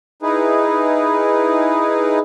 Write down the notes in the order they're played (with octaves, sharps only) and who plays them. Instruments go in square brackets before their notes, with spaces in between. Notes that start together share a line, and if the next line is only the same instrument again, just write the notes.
[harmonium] D#4 E4 G#4 B4